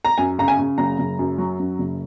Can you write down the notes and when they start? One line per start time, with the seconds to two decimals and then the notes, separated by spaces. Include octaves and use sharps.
0.05 A#5
0.18 F#2 G#5
0.39 C#3 A#5
0.48 G#5
0.59 C#3
0.78 F#1 A#5
0.99 F#1
1.19 F#2
1.38 F#3
1.59 F#2
1.79 F#1